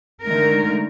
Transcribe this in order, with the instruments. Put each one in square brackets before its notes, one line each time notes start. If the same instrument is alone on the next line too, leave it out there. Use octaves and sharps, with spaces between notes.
[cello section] D3 D#3 G#3 A3 A#4